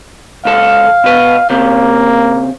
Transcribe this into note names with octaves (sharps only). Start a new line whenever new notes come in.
C#2 A4 F5
B2 B4
C#3 A#3 C4